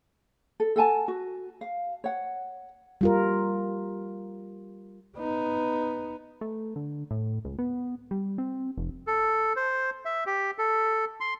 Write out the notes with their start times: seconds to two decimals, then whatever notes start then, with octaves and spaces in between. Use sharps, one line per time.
0.60 A4
0.76 A4 F#5 G#5 A5
1.08 F#4
1.61 F5
2.04 C#5 F#5
3.01 G3 F4 A#4
5.17 B3 D#4
6.41 A3
6.76 D3
7.11 A2
7.45 C#2
7.58 B3
8.11 G3
8.38 C4
8.78 F1
9.07 A4
9.56 C5
10.05 E5
10.26 G4
10.58 A4
11.20 C6